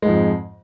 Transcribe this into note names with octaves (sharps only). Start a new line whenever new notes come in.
F2 G#2 F3 G#3